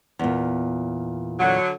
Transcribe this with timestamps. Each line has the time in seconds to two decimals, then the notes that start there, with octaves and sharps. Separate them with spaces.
0.19 E2 A#2
1.39 D3 F#3